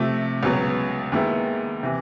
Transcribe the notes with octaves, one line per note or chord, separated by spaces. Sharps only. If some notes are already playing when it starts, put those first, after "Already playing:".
Already playing: C3 F3 A3
C#2 B2 F#3 B3
D#2 D#3 G#3 B3 E4
C3 E3